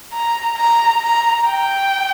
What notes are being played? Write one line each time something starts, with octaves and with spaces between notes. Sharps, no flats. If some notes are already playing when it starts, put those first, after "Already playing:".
A#5
A#5
A#5
G5